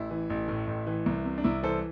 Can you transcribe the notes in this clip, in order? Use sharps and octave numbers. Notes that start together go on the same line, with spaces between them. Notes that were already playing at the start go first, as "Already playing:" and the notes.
Already playing: A1 E4
E3
A1
A2
A1
E3
C2
C3
D4
C2 E4
E3 A4 C5